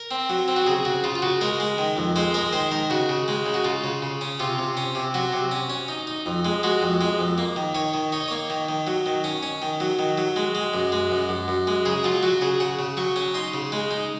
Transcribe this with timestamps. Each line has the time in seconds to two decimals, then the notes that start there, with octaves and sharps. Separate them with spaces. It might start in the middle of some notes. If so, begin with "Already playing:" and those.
Already playing: A#4
0.11 C4
0.30 F#3
0.48 C4
0.56 F#4
0.66 C#3 G#4
0.85 C#3 F#4
1.04 C#3 F4
1.15 F4
1.22 C#3 F#4
1.41 G#3 A#4
1.60 G#3
1.78 D#3
1.97 F2
2.16 G#3 C5
2.34 G#3 A#4
2.53 D#3 C5
2.71 D#3 A#4
2.90 C#3 F#4
3.09 C#3
3.28 G#3
3.46 C#3
3.54 F#4
3.64 C#3 F4
3.84 C#3
4.02 C#3
4.21 C#4
4.40 C3 F4
4.58 C3
4.77 C#4
4.95 C3
5.14 F#3 F#4
5.33 C3
5.51 C#4
5.70 C#4
5.88 D#4
6.07 D#4
6.26 F2
6.45 G#3
6.63 G#3 F#4
6.82 F2
7.01 G#3
7.19 F2
7.38 A#3
7.56 D#3
7.75 D#3 C#5
7.94 D#3
8.12 D#4 C#5
8.20 D#5
8.28 A#3 C#5
8.50 D#3
8.69 D#3
8.87 F#3
9.06 D#3
9.24 C#4
9.43 C#4
9.62 D#3
9.80 F#3
9.99 D#3
10.18 F#3
10.36 G#3
10.55 G#3
10.74 F#2
10.92 G#3
11.11 F#2
11.29 F#2
11.48 F#2
11.67 G#3
11.85 C#3 G#4
12.04 F#3 F4
12.23 F#3 F#4
12.41 C#3 G#4
12.60 C#3 F#5
12.79 C#3
12.97 F#3 C#6
13.16 C#4
13.34 D#4 C6
13.54 C#3
13.72 G#3
13.91 D#4